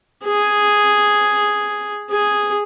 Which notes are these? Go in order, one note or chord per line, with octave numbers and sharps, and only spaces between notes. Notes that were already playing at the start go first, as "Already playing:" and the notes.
G#4
G#4